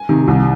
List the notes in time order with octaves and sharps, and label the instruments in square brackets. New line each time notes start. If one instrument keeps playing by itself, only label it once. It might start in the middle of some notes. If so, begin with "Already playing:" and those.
Already playing: [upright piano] G#5
C3 D#3
C2